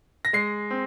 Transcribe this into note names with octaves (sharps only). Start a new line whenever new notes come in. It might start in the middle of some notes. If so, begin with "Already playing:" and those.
A#6
G#3 C7
C4